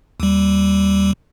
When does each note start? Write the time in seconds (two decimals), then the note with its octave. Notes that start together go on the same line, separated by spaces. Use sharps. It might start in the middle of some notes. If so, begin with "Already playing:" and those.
0.20 D#2 G3